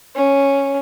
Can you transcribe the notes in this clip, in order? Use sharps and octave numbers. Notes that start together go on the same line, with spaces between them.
C#4